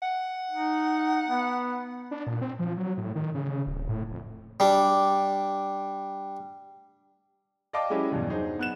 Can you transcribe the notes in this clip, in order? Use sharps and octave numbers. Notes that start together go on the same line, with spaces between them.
F#5
D#4
B3
D4
A#2
C4
F3
F#3
A2
D#3
C#3
D1
A2
F2
G3 D4
D5 D#5 F5 G5 A5 D6
F#3 G#3 C#4 E4 G4 D#5
E2 G2 B2
F#3 D4 D#4 G#4 C5
B3 F#6 E7